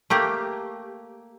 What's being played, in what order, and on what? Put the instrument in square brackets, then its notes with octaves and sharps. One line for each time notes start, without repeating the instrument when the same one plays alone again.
[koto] A3 A#3 G4